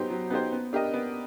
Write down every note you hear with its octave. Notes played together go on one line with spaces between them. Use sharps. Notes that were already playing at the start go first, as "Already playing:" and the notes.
Already playing: F#3 B3 D#4 G4 C5
F#3
B3 D#4 G4 C5
B3
D4 G4 A#4 D#5
B3